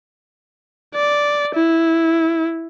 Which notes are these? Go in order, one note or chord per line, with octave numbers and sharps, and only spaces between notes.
D5
E4